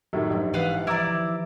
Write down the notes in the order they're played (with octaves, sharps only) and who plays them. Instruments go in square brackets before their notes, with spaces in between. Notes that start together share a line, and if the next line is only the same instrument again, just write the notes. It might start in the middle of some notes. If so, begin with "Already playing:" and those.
[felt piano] F#2 A2 D#3 [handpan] G4
[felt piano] A#1 G#2
[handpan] E3 [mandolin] B4 F5 F#5
[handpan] F3 [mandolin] E4 D5 [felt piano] A#5 D6 E6
[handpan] D#3